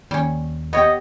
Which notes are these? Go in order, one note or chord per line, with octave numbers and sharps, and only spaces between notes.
D#2 G3 C#4
B3 G4 C#5 D#5 F#5